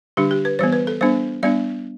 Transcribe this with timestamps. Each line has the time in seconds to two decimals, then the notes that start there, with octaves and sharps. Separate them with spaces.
0.17 D3 G3 D4 G4
0.31 G4
0.45 B4
0.59 E3 G3 B3 C5
0.73 B4
0.87 A4
1.01 G3 B3 D4 C5
1.43 G3 B3 D4 D5